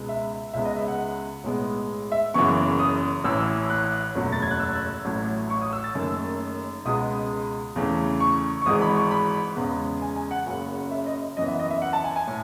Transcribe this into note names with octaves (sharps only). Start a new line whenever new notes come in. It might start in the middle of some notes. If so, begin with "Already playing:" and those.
Already playing: C#2 B2 G#3 B3
E5
C#2 C#3 G#3 B3 E5
D#5
E5
F#5
B1 A2 G#3 B3
E5
F#1 F#2 C#3 E3 B3 C#6
D#6
A1 A2 E3 E6
F#6
F#1 E2 B2 F#3 A3
A6
G#6
F#6
E6
A1 A2 F#3 A3
C#6
D#6
E6
A6
F#1 F#2 D#3 A3 E6
C#2 B2 G#3 B3 D#6
E2 C#3 E3 A3
C#6
C#6
G#1 G#2 E3 G#3 D#6
B5
C#6
B5
E2 C#3 G#3 B3
G#5
G#5
F#5
F#1 F#2 C#3 F#3
E5
D#5
F#2 E3 B3 D#5
E5
D#5
E5
F#5
A5
G#5
G#5
A2